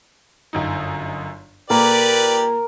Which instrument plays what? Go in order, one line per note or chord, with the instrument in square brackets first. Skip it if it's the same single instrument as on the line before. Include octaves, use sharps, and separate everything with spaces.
[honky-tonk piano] G1 F#2 D#4
[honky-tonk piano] A#2 A#3 [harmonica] G4 B4 D5 [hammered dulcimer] A#4 D6